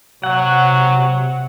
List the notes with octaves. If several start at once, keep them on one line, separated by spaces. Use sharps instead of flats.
C3 F#3 F#5